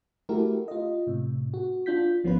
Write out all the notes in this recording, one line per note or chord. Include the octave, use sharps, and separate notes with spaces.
A3 E4 F#4 G4 A4 A#4
F4 D#5
A2 C3
F#4
D4 F4 G6 B6
G#1 F3 B3 C#4 F4 B4